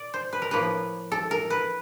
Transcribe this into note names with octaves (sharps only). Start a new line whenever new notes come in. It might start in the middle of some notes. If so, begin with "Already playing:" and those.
Already playing: A#2 D5
C5
B4
A#4
A2 F3 A#3 B4
A4
A#4
B4